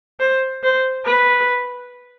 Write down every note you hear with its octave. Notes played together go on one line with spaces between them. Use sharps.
C5
C5
B4